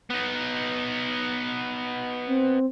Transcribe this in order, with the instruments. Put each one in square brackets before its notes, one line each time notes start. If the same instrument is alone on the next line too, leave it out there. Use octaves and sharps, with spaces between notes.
[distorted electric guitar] B3 D#4
[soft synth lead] C4